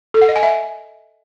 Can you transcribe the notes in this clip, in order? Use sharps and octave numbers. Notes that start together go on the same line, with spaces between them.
A4
F#5
D#5
G#5
E5